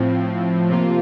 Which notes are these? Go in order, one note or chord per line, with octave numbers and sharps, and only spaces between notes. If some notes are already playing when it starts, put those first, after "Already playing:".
Already playing: A2 F3 C4
C3 F3 A#3 F4